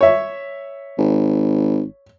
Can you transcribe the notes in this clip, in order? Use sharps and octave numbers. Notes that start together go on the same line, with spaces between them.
C#5 E5
G#1